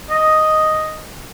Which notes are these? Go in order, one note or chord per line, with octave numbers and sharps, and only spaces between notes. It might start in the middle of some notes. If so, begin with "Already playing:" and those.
D#5